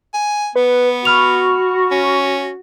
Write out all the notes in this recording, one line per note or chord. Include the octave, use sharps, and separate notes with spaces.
G#5
B3 B4
F#4 B5 C#6 F6 F7
C#4